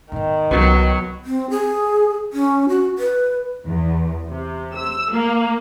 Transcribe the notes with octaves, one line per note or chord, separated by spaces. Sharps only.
G#2 D#3 B3
C2 F#3 B3
C4
G#4
C#4
F#4
B4
E2
C3
E6
A#3